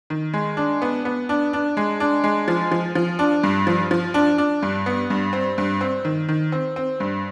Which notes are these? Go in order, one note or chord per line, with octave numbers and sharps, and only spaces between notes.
D#3
G#3
D4
B3
B3
D4
D4
G#3
D4
G#3
F3
F3
F3
D4
G2
F3
F3
D4
D4
G2
B3
G2
C4
G2
C4
D#3
D#3
C4
C4
G2